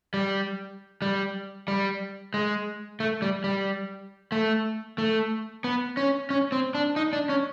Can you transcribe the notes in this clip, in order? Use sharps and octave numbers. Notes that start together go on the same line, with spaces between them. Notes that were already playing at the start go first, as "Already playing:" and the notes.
G3
G3
G3
G#3
A3
G3
G3
A3
A3
B3
C#4
C#4
C4
D4
D#4
D4
C#4